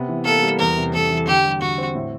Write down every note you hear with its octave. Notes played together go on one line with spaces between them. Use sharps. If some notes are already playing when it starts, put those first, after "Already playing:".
Already playing: C3 B3
E3
A#3 A4
G3
E2 A#4
C3
E2 A4
E3
D3 G4
G3
D3 F#4
C4
A2